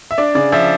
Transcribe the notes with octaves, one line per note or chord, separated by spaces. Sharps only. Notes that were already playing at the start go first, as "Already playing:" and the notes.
E5
D4 D5
C#3 D5
F3 E5